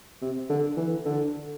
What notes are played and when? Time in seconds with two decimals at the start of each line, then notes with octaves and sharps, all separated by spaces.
0.22 C3
0.50 D3
0.77 E3
1.05 D3